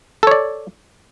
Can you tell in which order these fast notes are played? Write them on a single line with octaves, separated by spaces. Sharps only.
A4 C#5 D5